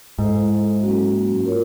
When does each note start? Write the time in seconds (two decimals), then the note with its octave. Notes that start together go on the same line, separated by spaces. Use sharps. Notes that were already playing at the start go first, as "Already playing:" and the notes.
0.19 G#2 E4 A4 C5 E5
0.81 F#3 A#3 C#4 F#4
1.45 F4 A#4 C#5